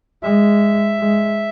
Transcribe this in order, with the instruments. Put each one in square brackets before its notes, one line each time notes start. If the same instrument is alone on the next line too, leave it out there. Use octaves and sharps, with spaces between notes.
[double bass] G#3 [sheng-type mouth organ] E5
[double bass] G#3